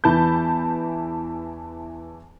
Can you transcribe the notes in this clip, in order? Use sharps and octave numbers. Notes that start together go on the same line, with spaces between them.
E2 E3 A5 B5 G6